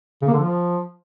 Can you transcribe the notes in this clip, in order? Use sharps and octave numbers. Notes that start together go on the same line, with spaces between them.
C#3
A#3
D3
F3